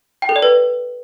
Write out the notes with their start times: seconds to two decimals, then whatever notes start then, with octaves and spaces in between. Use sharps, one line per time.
0.22 G5
0.29 A4
0.36 D5
0.42 B4